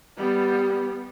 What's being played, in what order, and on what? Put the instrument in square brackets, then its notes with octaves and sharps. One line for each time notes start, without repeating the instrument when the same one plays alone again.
[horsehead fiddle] G3 B3